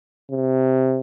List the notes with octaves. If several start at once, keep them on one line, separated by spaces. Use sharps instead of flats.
C3